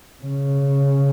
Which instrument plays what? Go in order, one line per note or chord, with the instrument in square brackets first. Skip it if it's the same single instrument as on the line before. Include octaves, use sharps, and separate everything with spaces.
[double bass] C#3